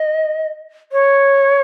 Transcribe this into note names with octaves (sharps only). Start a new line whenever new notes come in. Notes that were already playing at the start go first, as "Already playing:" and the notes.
Already playing: D#5
C#5